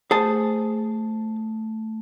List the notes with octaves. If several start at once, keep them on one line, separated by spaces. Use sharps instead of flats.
A3 G#4 C5 A5